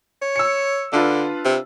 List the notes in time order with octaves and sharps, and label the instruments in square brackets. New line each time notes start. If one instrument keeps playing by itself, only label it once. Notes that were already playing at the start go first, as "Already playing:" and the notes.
[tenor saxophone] C#5
[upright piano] E6 C#7
[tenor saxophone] D3 [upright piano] D4 F4 B4
[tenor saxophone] C3